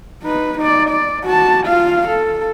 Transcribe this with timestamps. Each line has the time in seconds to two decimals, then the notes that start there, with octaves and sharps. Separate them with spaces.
0.22 D#4 B4
0.58 D#4 D5
0.89 D5
1.24 F#4 A5
1.66 F4 F5
2.08 A4